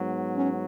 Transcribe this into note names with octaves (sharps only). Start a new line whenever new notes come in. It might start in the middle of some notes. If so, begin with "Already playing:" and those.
Already playing: G#2 F#3 B3
C#4